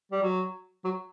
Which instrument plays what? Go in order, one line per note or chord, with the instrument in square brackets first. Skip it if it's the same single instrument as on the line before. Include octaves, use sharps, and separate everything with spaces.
[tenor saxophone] G3
F#3
F#3